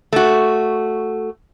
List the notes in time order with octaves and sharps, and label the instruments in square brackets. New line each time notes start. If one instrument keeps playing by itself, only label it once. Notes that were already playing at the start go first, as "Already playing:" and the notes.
[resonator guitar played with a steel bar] A3 F#4